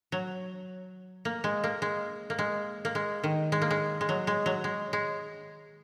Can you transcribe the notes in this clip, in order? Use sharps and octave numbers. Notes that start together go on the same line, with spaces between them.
F#3
A#3
G#3
A#3
G#3
A#3
G#3
A#3
G#3
D#3
G#3
A#3
G#3
G#3
F#3
G#3
F#3
G#3
G#3